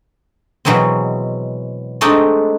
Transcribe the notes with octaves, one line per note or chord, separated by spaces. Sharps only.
B2 E3 F#3 G#3 C4
G#3 A3 C4 D4 D#4 G5